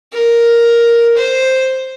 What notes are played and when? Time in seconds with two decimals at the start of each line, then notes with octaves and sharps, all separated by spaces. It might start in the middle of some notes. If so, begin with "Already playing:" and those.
0.13 A#4
1.17 C5